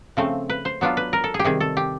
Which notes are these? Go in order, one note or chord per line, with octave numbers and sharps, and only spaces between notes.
C#3 F3 A3 C4
B4
C5
F#3 B3 D4 F4
B4
A#4
A4
G#4
G4
C3 D#3 G3 G#4
A4
G4